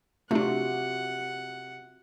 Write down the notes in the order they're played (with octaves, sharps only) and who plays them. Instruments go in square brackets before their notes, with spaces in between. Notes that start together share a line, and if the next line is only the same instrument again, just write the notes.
[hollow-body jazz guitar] C3 [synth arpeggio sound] A3 D4 [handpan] F4 F#4 [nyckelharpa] F#5